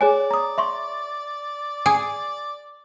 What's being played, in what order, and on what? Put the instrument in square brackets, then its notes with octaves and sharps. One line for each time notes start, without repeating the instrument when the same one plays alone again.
[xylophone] G#4 C#5 G#5 [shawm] D5
[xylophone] A#5 D#6
E5 C6 C#6
[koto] G#4